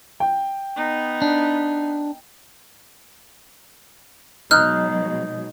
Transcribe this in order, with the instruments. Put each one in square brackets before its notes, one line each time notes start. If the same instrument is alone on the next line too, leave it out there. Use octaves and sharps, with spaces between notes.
[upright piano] G5
[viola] B3 D#4
[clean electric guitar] D4
[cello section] B2 F#3 G#3 [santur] D#4 [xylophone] F6 F#6